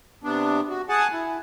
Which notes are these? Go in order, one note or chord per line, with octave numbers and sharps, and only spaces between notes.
C3 B3 D4
F#4
G#4 F#5 G#5 A5
E4